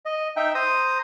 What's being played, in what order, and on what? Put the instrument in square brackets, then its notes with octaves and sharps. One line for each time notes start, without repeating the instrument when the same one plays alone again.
[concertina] D#5
D#4 E5 G5
C5 A#5 D#6